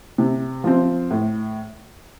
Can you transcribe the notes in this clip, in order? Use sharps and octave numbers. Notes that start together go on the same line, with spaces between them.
C3
F3 C4
A2